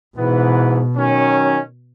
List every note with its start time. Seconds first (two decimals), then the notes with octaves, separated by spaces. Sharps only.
0.16 G#2 B2 E3 B3
0.96 D#3 F#3 C#4